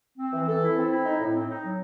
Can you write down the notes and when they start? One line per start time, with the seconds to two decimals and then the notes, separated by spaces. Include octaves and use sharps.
0.18 C4
0.33 E3
0.48 A4
0.62 E4
0.77 C4
0.91 E4
1.05 D#4
1.20 A2
1.34 C4
1.49 D#4
1.64 F#3